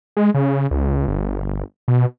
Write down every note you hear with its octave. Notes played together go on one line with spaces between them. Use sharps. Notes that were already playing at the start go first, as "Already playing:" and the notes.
G#3
C#3
C#2
G1
B2